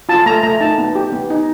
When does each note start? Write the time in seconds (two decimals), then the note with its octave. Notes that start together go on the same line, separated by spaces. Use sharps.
0.09 F4 A5
0.26 A3 A#5
0.43 A3 A#5
0.61 D#4 A5
0.78 B3
0.95 G4
1.12 B3
1.30 D#4